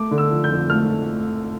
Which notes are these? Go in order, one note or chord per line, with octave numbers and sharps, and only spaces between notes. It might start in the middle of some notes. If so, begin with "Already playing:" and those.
Already playing: A3 D6
D3
E6
F3
G6
F2
A3 F6